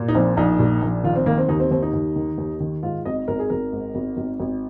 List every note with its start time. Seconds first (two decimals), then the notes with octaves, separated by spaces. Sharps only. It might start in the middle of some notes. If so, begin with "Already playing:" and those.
Already playing: A#2
0.08 D#4
0.15 A#1 C4
0.37 A#1 D#4
0.59 A#2
0.82 A#1
1.04 D#3 F4
1.16 C4
1.26 D#3 A#3
1.38 C4
1.48 D#2 D#4
1.60 C4
1.71 D#2 C4
1.82 D#4
1.94 D#2
2.16 D#3
2.38 D#2
2.60 D#3
2.83 G#2 F4
3.05 G#1 D#5
3.28 G#1 A#4
3.39 G#4
3.50 G#1 A#4
3.73 G#2
3.95 G#1
4.17 G#1
4.40 G#1